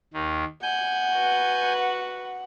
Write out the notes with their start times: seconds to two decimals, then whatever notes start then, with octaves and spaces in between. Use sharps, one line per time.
0.14 D#2 D#3
0.62 F#5 G#5 G6
1.13 F#4 B4